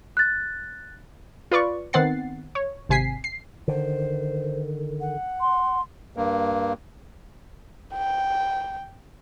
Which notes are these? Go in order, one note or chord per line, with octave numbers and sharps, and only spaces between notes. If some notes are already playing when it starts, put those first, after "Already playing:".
F#6 A6
F4 B4 D5 C#6
D#3 B3 C4 F#5 A6 C7
C#5
G#1 C3 G#5 B6 C7
C7
D3 D#3 C5
F#5
C6
G2 A#3
G5